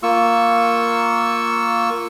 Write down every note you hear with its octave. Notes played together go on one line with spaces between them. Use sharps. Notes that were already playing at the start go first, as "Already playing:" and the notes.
A#3 F4 C#6 E6